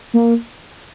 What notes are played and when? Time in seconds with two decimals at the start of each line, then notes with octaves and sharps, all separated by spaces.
0.14 A#3